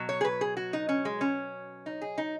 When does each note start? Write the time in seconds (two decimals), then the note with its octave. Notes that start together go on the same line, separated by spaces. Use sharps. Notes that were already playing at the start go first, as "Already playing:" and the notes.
Already playing: B2 F#3
0.09 C#5
0.21 G#4
0.25 B4
0.41 G#4
0.57 F#4
0.73 D#4
0.89 C#4
1.05 G#3
1.21 C#4
1.86 D#4
2.02 G#4
2.18 D#4